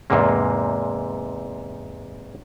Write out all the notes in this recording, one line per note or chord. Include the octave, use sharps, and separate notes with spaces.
E2 G#2 C3 A#3